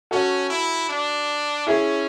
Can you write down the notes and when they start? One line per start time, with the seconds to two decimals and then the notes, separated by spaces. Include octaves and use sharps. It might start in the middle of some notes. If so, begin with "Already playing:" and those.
0.11 C#4 F#4 A4
0.50 E4
0.89 D4
1.67 C#4 E4 G#4